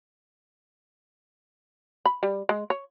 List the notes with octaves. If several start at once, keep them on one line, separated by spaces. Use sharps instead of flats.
B5
G3
G#3
C#5